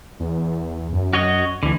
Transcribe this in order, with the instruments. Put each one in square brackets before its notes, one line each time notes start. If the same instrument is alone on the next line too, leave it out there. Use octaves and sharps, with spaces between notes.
[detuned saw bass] E2
F#2
[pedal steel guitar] F#4 C#5 D#5
[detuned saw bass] D2 [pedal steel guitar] D3 E3